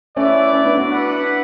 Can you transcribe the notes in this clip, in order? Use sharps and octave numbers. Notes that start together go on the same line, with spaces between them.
A3 C#4 E4 B4 D5
A3 C#4
B3 D4
D4 F#4
E4 B4 D5 F#5